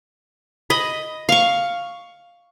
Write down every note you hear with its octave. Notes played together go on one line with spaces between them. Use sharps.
D#5 B5
F5 C#6